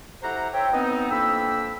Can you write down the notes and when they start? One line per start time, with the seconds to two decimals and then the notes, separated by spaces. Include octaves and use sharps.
0.23 E4 G4 A4 C5 F#5 A#5
0.54 C5 C#5 E5 G5
0.72 B3 C4 D#4
1.10 F2 A#3 D4 G5 B5 E6